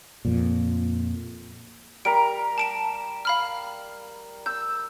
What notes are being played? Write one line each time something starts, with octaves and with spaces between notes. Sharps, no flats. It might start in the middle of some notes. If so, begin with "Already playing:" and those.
F2 A#2
G3 A#4 A#5 D7
A5 D7 E7
F5 B5 F6
E6 G6